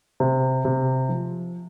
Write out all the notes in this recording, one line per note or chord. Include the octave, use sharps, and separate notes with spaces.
C3
C3
F3